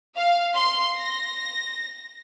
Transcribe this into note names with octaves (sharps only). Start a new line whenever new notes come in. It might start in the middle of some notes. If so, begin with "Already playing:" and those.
F5
C6
A#6